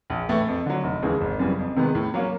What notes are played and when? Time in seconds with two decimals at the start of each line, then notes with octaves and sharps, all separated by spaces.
0.10 A#1
0.29 A2 E3 A3
0.48 F2
0.66 D3 F#3
0.84 F1
1.02 D#2 C#3 E3 G#3
1.21 G#1
1.39 F#2 C#3 E3 G3
1.59 F2
1.76 C3 D#3 G#3 B3
1.95 A2
2.14 F#3 A#3 C#4